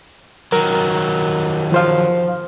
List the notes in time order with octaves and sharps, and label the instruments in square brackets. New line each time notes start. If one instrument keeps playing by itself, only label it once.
[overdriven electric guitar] D#3 F#3 [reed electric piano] A#4
[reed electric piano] F3 C5 F5